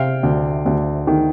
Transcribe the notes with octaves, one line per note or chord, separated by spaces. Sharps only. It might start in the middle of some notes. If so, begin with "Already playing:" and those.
Already playing: C3 F5 G5
D2
D2
D#3